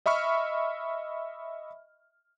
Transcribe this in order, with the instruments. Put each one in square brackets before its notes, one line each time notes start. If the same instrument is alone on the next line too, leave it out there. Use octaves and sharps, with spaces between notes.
[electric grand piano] D#5 E5 B5 C#6 F6